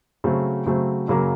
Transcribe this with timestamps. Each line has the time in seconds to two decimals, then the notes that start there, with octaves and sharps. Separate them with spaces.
0.24 C#3 F#3 A3 C4
0.66 C#3 F#3 A3 C4
1.08 F#2 C#3 F#3 A#3